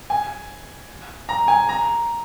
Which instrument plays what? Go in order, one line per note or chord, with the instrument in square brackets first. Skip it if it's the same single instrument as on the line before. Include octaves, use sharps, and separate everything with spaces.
[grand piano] G#5
A#5
G#5
A#5